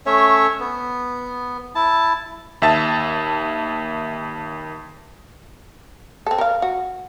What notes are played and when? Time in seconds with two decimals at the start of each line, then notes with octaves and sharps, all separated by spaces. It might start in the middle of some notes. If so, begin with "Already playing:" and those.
0.06 A3 C#4 C#5 E5
0.60 B3
1.75 E4 A5
2.62 D#2 E5 A5 A6
6.26 C4 A4
6.38 A#4 F5
6.62 F#4